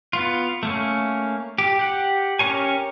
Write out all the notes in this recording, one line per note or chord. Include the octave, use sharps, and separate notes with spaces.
B3 F4
A3 A#3 C#4
G4
G4 F#5
C#4 G4 A#4 C#5 G#5